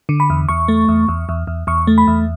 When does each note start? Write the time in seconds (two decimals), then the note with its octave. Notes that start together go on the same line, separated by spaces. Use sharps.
0.09 D3
0.20 B5
0.30 E2
0.49 E2 C#6
0.68 A3
0.88 E2
1.08 E2
1.29 E2
1.47 E2
1.67 E2 C#6
1.87 A3
1.98 B5
2.07 E2